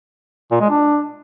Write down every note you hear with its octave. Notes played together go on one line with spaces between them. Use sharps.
A#2
G#3
D4